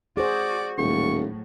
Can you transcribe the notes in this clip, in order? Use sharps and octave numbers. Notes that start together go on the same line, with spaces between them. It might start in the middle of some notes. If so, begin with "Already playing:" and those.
F#4 G#4 C5 D5
D#1 A2 F#3 C#6